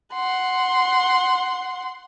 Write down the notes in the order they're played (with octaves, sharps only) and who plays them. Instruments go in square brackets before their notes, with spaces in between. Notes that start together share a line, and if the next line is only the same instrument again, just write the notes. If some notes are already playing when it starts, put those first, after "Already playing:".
[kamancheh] F#5 C6